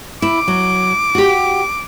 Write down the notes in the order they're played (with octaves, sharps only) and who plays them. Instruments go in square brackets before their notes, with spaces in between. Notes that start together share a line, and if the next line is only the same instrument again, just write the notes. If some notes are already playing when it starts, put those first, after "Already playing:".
[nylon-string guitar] E4 [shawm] D6
[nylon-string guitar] F#3
F#4 G4